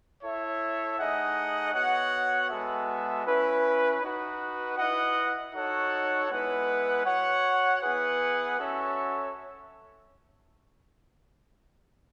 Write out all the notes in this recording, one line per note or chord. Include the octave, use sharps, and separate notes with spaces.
E4 A4 C#5 E5
A3 D#4 G#4 D#5 F#5
B3 F#4 C#5 F#5
G#3 B3 F#4 A4 E5
C#4 E4 B4
D#4 F#4 B4
E4 B4 D#5 F#5
D#4 F#4 A4 C#5 F#5
G#3 B3 E4 B4 F#5
F#4 C#5 F#5
B3 E4 G#4 B4 F#5
C#4 F#4 A4 C#5 E5